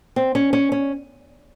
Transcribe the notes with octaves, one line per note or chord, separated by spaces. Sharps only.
C4
C#4
C#4
C#4